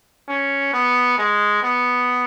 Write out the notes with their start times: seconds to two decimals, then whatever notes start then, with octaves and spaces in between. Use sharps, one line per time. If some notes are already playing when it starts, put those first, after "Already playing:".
0.28 C#4
0.73 B3
1.18 G#3
1.63 B3